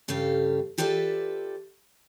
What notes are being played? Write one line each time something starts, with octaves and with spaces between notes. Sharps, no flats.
G2 C#3 G4 A4 F5
F4 G4 A4 B4 D5 E5